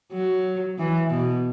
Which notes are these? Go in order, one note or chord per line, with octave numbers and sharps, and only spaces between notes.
F#3
E3
B2